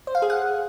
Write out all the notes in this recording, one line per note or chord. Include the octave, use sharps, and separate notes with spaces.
C5
F5
G#4
F#5